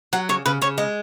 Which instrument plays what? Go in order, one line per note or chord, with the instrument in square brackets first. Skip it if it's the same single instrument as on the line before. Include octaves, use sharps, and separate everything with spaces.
[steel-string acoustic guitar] F#3 [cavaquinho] F#5
[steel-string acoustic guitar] C#3 [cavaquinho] C#5
[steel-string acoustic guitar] C#3 [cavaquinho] B4
[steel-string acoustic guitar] C#3 [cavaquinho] C#5
[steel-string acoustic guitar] G#3 [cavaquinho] D#5